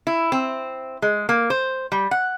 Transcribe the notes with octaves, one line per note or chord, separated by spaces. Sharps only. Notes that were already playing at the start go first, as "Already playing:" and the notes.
E4
C4
G#3
A#3
C5
G3
F#5